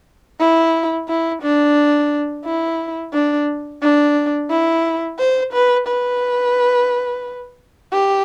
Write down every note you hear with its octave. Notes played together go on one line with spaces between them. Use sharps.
E4
E4
D4
E4
D4
D4
E4
C5
B4
B4
G4